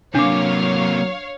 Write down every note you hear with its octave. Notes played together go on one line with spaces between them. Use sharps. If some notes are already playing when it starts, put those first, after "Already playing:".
C3 F#3 A#3 D4 C#5 F5 D6